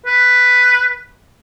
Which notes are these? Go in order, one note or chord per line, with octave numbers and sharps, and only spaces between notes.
B4